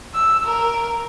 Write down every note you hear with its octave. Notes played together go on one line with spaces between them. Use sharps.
E6
A#4